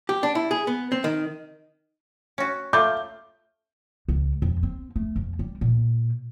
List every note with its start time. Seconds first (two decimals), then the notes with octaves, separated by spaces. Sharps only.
0.09 G4
0.23 D4
0.35 E4
0.51 G#4
0.67 B3
0.92 C4
1.04 D#3
2.38 C#4 F#4
2.73 A3 F4 D6 G6
4.08 C#2
4.42 F2
4.63 C4
4.96 A3
5.16 F2
5.39 G3
5.61 A#2